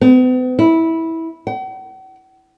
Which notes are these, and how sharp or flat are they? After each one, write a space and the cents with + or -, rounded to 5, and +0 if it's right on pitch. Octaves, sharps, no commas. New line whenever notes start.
B3 +45
E4 -15
F#5 +45